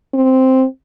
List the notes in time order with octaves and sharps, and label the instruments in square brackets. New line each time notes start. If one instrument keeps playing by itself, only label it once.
[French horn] C4